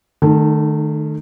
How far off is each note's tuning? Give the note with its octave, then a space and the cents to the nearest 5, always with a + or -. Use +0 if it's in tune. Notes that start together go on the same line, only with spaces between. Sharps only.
D#3 -30 A3 +0 D#4 +0